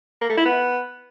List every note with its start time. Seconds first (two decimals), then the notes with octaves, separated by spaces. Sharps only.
0.21 A#3
0.29 A3
0.37 E4
0.45 B3